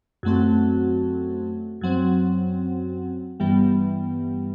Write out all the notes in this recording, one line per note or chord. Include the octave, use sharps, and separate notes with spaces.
F#2 F#3 A3 C4 F#4
F#2 F#3 C4
G2 E3 G3 B3